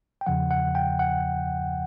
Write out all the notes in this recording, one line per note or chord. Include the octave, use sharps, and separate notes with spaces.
G5
E2 C#3 F3 F#5
F#5
G5
F#5